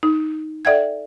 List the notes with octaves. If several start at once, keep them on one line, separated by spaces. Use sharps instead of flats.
D#4
A4 D5 E5 F#5 G5 G#6